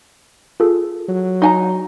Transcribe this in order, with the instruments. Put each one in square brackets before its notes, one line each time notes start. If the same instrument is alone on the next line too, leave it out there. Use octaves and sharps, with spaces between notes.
[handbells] F4 G#4 A4
[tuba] F#3
[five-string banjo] D#4 G#5 A#5